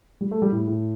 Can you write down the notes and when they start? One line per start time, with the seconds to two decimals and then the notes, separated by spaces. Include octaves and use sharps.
0.21 G3
0.31 A3
0.42 G3
0.52 A2
0.67 A2